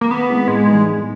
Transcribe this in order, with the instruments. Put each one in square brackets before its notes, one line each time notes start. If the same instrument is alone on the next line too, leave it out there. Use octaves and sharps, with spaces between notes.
[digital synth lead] A#3
[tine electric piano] D#3 [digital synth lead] B3
[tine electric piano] G#3 C4 E4 G#4
[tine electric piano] A2 [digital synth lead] G#3
[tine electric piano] E3 G3 B3 D#4
A2